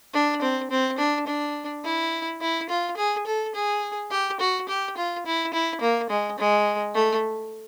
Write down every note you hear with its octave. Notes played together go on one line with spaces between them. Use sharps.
D4
C4
C4
D4
D4
E4
E4
F4
G#4
A4
G#4
G4
F#4
G4
F4
E4
E4
A#3
G#3
G#3
A3